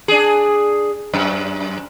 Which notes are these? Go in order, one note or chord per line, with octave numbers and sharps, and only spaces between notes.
D4 G#4
F#2